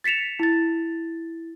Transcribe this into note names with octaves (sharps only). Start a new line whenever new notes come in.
A6 B6 C#7 E7 F7
E4 A6